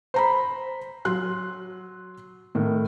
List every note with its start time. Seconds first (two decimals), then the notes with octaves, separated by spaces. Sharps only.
0.14 C5 A#5 B5
1.05 F#3 C6 F#6
2.55 A2 D#3